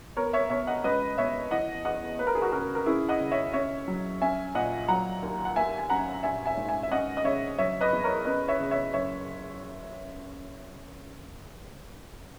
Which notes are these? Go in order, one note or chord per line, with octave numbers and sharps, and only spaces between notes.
B3 A#4 C#5
C#5 E5
B2 C#5 E5
D#5 F#5
C#2 B4 D#5
B2 C#5 E5
E3 D#5 F#5
E2 D#5 F#5
A#3 B4
A#4
G#4
F#4 A#4
C#3 F#4 A#4
A#4
C#4 E4 G#4
D#5 F#5
C#3
C#5 E5
C#4 C#5 E5
F#3
C#4 E5 G#5
A#2 D#5 F#5
F#3 F#5 A#5
D#2
F#5
A#3 E5 G#5
G#5
F#2 F#5 A#5
A#1 E5 G#5
E5 G#5
G#2
E5 G#5
E5
C#4 D#5 F#5
D#5
C#3 C#5 E5
F#3 C#5 E5
B4 D#5
E2
A#4 C#5
C#4 B4 D#5
C#5 E5
C#3
C#5 E5
F#1 C#5 E5